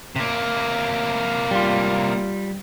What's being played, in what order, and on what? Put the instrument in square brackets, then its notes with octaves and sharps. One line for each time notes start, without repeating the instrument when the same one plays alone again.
[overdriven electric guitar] C3 A#3
[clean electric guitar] G3 F4